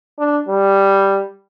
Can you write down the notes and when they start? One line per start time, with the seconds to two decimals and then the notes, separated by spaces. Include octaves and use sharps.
0.19 D4
0.48 G3